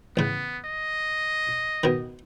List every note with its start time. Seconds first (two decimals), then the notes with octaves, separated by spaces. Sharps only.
0.17 A1 C#3 B3
0.65 D#5
1.84 B2 D#3